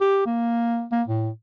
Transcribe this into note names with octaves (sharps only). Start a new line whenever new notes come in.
G4
A#3
A#3
A2